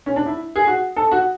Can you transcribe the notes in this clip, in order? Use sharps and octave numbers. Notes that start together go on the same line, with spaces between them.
C#4
D4
E4
G#4
F#4
A4
F#4